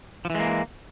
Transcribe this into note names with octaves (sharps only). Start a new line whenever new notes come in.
E3 F3 G#3 A#3